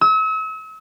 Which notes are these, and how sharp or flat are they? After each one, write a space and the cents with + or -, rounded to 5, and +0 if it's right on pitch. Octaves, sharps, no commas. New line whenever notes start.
E6 -40